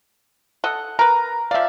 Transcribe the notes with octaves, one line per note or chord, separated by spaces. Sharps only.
A4 D#5 F#5
A#4 B4 A#5
F3 D5 E5 F5